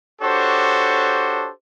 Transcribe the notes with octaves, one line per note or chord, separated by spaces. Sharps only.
D4 F#4 G4 A4 C5 C#5